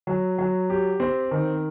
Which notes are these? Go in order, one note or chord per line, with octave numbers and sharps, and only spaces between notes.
F#3
F#3
G4
C4
D#3